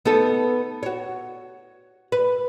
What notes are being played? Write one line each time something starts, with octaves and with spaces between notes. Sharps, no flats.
B3 D#4 A4
F#4 C#5
B4